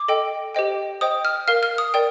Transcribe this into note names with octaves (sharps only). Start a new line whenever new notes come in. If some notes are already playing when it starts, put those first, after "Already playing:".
Already playing: D6
A4 D#5 G5
G4 C5 D#5 G5
C5 D#5 G5 D#6
F6
A#4 F5 F6
F6
D#6
A#4 D5 G5